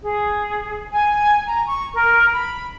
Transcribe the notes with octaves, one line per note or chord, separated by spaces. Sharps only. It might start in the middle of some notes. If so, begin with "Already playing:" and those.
G#4
G#5
A#5
C#6
A#4
B5